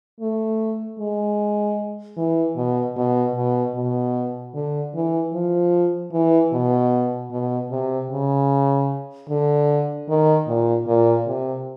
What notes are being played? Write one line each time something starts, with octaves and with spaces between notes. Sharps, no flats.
A3
G#3
E3
B2
B2
B2
B2
D3
E3
F3
E3
B2
B2
C3
C#3
D3
D#3
A#2
A#2
C3